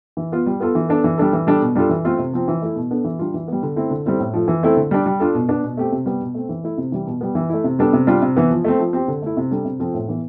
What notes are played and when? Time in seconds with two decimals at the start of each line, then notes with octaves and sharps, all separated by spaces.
0.17 E3
0.32 B3 F4
0.46 G3
0.60 B3 F4 A4
0.75 E3
0.89 B3 D4 A4
1.04 E3
1.18 G3 D4 A4
1.33 E3
1.47 G3 D4 A4
1.62 B2
1.75 G3 D4 F4 A4
1.89 E3
2.05 A3 C4 F4 A4
2.19 C3
2.33 F3 C4
2.48 E3
2.62 A3 E4
2.76 B2
2.91 B3 D4 A4
3.04 E3
3.19 G3 D4 F4
3.34 E3
3.48 G3 B3
3.63 D3
3.76 A3 C4 E4
3.90 D3
4.06 G3 C4 E4 A4
4.20 A2
4.34 F3 A3
4.48 E3
4.63 A3 C4 E4 A4
4.76 D3
4.91 G3 D4
5.06 G3
5.20 D4 F4 A4
5.34 B2
5.49 B3 D4
5.64 B2
5.77 A3 C4 G4
5.92 C3
6.06 G3 B3
6.21 B2
6.34 A3 C4
6.49 E3
6.64 A3 E4
6.78 C3
6.92 E3 G3
7.07 B2
7.21 G3 B3
7.35 E3
7.49 A3 E4
7.64 C3
7.79 G3 B3 D4 A4
7.93 C3
8.07 G3 D4 F4
8.22 C3
8.36 E3 B3
8.51 F3
8.64 A3 C4
8.79 F3
8.93 C4 G4
9.08 D3
9.22 A3 E4
9.37 C3
9.51 G3 D4 A4
9.65 C3
9.79 F3 C4 F4 A4
9.94 A2
10.08 E3 B3